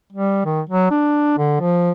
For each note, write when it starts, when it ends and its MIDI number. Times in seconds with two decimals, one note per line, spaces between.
0.12 0.42 55
0.45 0.61 51
0.69 0.90 54
0.91 1.38 62
1.38 1.58 50
1.61 1.91 53